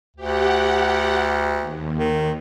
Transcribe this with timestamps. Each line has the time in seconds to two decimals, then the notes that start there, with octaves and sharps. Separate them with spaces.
0.16 D2 G4 F#5
1.60 D#2
1.98 D#3